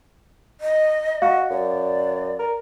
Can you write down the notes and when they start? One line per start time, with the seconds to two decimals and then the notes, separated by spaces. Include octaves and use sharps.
0.61 D#5
1.22 F#4 F5
1.50 F#2 D5
2.39 A#4